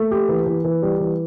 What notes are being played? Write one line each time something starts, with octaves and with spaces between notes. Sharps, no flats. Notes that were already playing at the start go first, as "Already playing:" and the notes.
Already playing: A3
G4
E3
E3
E3
G3
E3